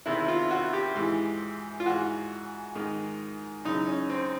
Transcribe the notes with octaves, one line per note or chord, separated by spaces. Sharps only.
E2 C3 D#3 E4
F4
F#4
G4
G#2 E3
F4
G#2 E3 F#4
G#2 D#3
F#2 C#3 E3 D#4
C#4
C4